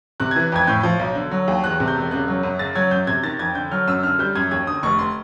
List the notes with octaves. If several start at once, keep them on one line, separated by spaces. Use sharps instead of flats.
C3 F#6
G#6
E3
F2 G#6
A2 G6
F3
B1
D3
F#3
D#2
E2 F#6
C3
G6
E1
C#3 F#6
F#3
F#2
C#3 A6
F#3 G#6
F#2 G6
C3 G#6
D#3 A6
F2 G#6
D3 G6
F#3 F6
F#2 E6
D3 F6
G3 G6
F#2 G#6
D#2 G#6
D3 D#6
F1 C#6
C6